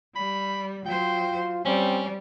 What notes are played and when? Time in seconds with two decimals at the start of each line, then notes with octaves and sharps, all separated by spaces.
0.16 G3 B5
0.86 F#3 F4 C5 G5
1.65 G3 C4 C#4